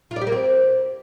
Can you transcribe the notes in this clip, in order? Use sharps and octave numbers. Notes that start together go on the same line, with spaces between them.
F4
D5
G4
A#3
C4